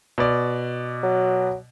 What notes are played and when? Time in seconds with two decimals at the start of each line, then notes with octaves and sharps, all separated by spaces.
0.18 B2 D5
1.03 F#3